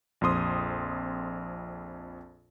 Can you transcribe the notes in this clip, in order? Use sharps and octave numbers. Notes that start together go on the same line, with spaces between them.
A#1 F2 C4 C6 D#6